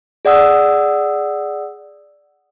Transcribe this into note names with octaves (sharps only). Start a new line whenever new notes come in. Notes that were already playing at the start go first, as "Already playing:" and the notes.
G#4 D5 F#5 D#6 E6